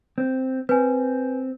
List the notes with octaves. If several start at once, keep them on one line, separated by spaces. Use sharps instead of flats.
C4
C4 B4 G#5